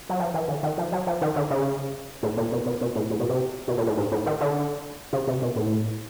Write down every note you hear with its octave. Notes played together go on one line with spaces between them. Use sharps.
F#3
F3
E3
D3
D#3
F3
F#3
F3
D#3
D3
C#3
A2
A#2
B2
B2
B2
A2
A2
B2
C3
B2
A#2
A2
G#2
A2
D#3
D3
C#3
C3
B2
A2